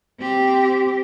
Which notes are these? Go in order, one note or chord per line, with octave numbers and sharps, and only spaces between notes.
C4 G4